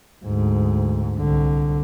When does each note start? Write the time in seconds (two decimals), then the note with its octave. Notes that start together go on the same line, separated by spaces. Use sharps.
0.25 D2 G#2
1.18 C2 D3